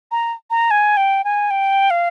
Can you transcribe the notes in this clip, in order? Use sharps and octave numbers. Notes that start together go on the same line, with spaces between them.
A#5
A#5
G#5
G5
G#5
G5
F5